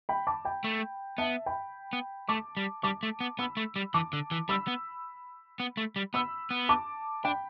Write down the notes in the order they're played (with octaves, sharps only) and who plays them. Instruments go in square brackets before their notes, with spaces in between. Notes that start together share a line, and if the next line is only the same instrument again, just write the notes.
[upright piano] G5 B5
A5 D6
G5 B5
[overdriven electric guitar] A3
[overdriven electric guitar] B3 [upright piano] E5 A5
[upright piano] G5 B5
[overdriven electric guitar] B3
[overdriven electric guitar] A3 [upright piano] A5 D6
[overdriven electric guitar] G3
[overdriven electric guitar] G3 [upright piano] A5 D6
[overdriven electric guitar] A3
B3
[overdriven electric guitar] B3 [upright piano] B5 E6
[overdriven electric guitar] A3
G3
[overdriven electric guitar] E3 [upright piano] A5 D6
[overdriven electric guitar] D3
E3
[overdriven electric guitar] G3 [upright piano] B5 E6
[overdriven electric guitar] B3
B3
A3
G3
[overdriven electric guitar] B3 [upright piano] B5 E6
[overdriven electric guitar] B3
[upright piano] A5 D6
[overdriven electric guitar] D4 [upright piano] G5 B5